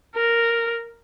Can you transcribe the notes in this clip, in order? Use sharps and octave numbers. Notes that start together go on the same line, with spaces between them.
A#4